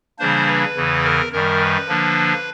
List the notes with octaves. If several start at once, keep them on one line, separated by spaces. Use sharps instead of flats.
C#3 E3 G3 A#3 D4 C5
B4
E2 C#3 E3
A#4
F#2 D#3 G3 A#4
B4
D3 F3 A#3 D4